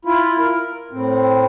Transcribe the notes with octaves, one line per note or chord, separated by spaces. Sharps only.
E4 F4
A#4
A2 C4